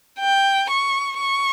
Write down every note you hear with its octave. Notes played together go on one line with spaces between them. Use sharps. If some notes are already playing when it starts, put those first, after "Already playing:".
G5
C#6
C#6